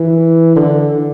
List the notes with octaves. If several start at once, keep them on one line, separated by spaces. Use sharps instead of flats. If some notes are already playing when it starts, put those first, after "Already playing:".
Already playing: E3
D3